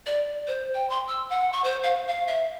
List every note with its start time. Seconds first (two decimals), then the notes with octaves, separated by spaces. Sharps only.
0.06 D5
0.47 C5
0.74 G5
0.90 C6
1.08 E6
1.30 F#5
1.52 C#6
1.64 C5
1.83 F5
2.08 F5
2.27 E5